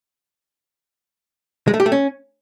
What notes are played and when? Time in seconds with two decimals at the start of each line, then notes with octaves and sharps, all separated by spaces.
1.68 G#3
1.74 A3
1.80 G4
1.86 A3
1.92 C#4